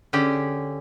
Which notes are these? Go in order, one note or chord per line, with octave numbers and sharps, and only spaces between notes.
D3 C#4 G4 G#4